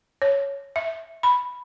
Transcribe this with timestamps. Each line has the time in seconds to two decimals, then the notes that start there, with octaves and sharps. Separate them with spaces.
0.22 C#5
0.76 E5
1.23 B5